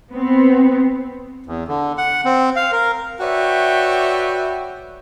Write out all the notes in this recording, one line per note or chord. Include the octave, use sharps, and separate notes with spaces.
B3 C4
E2
D3
F#5
C4
F5
A#4
F#4 B4 C#5 D5 E5 G5